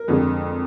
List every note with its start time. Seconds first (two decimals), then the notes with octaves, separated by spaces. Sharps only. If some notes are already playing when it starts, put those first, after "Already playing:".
Already playing: A#4
0.08 F2 D3 G#3